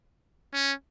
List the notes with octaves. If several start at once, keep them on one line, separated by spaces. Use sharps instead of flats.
C#4